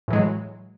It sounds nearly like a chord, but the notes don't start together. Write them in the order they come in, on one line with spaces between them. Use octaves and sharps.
A2 E3 G#3 F#3